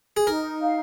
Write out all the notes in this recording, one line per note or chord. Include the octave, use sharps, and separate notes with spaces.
G#4
D#4 A#4
F5